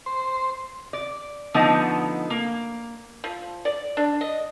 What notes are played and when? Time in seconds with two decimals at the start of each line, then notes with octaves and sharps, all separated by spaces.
0.06 C5
0.93 D5
1.54 D3 F3 A3 B3 D#4
2.30 A#3
3.24 F3
3.65 D5
3.97 D4
4.21 D#5